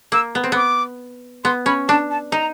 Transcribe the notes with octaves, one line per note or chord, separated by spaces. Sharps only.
A#3 E6
B3
C4
B3 D6
B3 C6
C#4 B5
D4 A5
A5
D#4 A#5